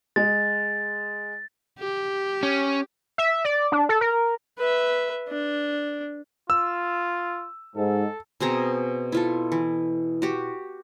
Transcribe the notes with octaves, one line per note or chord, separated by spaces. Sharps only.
G#3 A6
G4
C#4
E5
D5
D4
A4
A#4
B4 E5
D4
F4 E6
G#2 A4
B2 C4 G#4 A#5
E4 F4 A4
E3
F#4 G4